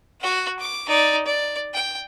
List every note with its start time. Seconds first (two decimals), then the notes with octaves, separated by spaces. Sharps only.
0.21 F#4 F#5
0.59 D6
0.88 D#4 D5
1.25 D5
1.74 G5